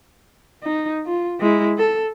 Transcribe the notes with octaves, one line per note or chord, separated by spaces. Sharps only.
D#4
F4
G#3 E4
A4